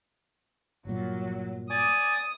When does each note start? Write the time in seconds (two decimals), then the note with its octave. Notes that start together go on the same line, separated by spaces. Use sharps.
0.85 G1 G2 A#2 F#3
1.70 D5 G#5 D6 D#6